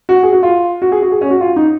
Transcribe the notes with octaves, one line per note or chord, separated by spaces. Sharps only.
F#4
G#4
F#4
F4
F#4
G#4
F#4
G#4
C#4
F#4
F4
D#4